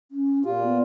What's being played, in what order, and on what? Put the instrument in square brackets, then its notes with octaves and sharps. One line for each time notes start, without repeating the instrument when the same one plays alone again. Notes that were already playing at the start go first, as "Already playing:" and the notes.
[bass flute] C#4
[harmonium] A#2 F4 [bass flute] G4
[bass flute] B3